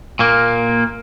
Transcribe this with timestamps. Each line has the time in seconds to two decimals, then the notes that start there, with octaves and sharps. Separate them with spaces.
0.19 A#2 A#3